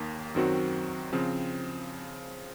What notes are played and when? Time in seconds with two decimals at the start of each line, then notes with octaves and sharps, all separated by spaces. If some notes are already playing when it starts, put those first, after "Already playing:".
Already playing: D#2 D#3 A#3
0.35 F#2 D#3 F#3 C4 F#4
1.12 C#3 F3 C4